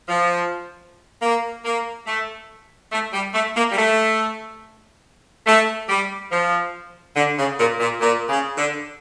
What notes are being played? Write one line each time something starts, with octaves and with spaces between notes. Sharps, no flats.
F3
A#3
A#3
A3
A3
G3
A3
A#3
G3
A3
A3
G3
F3
D3
C#3
A#2
A#2
A#2
C#3
D3